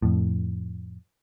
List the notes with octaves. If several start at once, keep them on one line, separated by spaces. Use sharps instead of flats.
F2 A2